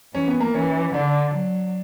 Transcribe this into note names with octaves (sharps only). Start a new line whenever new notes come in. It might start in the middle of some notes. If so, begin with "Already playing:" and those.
E3 C#4
B3
A#3
E3 C#4
D3 D4
F#3